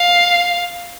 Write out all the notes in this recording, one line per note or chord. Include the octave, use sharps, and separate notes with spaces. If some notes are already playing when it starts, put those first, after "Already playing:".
Already playing: F5